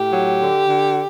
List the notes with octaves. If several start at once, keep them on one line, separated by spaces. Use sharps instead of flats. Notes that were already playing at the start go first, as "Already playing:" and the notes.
Already playing: A2 G4
F#3
D3
D3